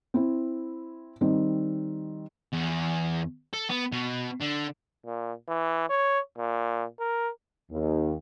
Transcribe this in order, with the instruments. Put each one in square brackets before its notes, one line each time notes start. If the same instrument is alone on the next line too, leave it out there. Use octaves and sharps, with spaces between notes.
[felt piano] C4 E4
D#3 G3 C4
[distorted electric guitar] E2
A4
B3
B2
D3
[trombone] A#2
E3
C#5
A#2
A#4
[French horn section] D#2